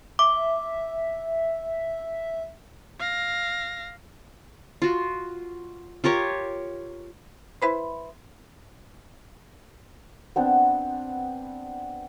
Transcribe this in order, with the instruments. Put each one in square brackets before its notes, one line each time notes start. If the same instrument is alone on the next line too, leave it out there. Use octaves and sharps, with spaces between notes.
[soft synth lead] E5 [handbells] D6
[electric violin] F5 A#6
[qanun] F4 F#4
F4 G4 A#4 C#5
[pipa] E4 B4 C5
[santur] B3 C4 D4